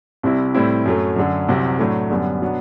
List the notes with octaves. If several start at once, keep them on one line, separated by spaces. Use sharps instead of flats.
C2 C3 G3 C4 E4
A2 G3 C4 E4
F#2 F#3 A3
F#2 D3 F#3
C2 C3 F#3 C4
A2 F#3 A3 D4
F#2 D3 G3 B3
B2 F#3 B3 D4